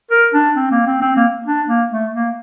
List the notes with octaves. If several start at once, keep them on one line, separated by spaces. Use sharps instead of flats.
A#4
D4
C4
A#3
C4
C4
A#3
D4
A#3
A3
A#3